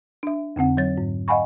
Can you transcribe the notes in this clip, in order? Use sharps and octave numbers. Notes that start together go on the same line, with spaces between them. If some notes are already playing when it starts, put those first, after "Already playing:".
D4 E5
F2 D3 C4 F#5
F#3 C#5 A6
G#2
D#5 F5 F#5 G#5 B5 C#6